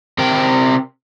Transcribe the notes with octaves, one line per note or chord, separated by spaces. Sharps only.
C3 A#4 G5